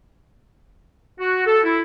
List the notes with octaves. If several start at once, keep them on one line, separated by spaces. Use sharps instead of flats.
F#4
A4
E4